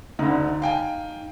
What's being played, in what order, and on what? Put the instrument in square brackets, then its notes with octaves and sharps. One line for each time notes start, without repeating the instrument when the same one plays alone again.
[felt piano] D2 D3 [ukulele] D#4
[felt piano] F5 G5 G#5